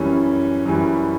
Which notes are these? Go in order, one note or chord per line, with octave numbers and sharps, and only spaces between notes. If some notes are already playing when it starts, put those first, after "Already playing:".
Already playing: F#2 E3 G3 C#4
F#2 E3 G3